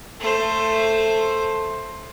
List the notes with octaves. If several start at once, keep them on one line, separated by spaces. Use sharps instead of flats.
A3 C5